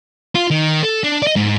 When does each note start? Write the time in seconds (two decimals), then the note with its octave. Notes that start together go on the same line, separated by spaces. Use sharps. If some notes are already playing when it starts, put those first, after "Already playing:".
0.35 F4
0.50 D#3
0.83 A4
1.04 D4
1.22 D5 D#5
1.36 G#2